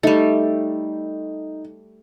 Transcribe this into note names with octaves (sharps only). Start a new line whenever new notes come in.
G3 A3 D#4